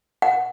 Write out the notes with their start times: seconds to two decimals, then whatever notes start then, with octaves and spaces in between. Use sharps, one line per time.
0.22 F#5